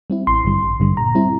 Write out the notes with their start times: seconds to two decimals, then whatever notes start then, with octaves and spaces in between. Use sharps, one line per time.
0.10 G3 C4 E4
0.27 A1 C6
0.45 G2 D3 G3
0.62 A1
0.80 G2 D3 G3
0.97 A#2 A#5
1.15 G3 C4 E4